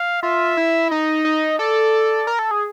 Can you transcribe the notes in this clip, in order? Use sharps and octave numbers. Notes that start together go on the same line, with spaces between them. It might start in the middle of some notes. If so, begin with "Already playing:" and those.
Already playing: F5
F4 E5
E4
D#4 D#5
D#4
A4 D5
A#4
A4
G#4